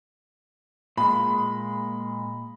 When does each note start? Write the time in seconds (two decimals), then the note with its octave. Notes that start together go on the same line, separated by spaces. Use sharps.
0.97 A#2 G#3 B5